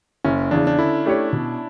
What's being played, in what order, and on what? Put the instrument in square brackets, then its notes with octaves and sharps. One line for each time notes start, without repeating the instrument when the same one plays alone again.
[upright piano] F#1 [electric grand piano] C#4
[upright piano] E2 C#3 [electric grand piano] D4
[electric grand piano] D4
[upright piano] D3 [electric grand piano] E4
[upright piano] A3 D4 G4 C#5
B2